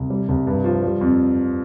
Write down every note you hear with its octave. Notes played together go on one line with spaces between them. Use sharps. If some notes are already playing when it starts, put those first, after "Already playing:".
Already playing: C2
G3
C2
G2
F3
G3
F2